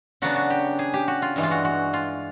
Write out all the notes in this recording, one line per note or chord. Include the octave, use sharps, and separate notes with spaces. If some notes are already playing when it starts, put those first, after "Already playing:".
C#3 F#3 B3 D4 F#4
F#4
G4
G#4
G4
F#4
F4
G2 E3 G#3
F4
F#4
F#4
F4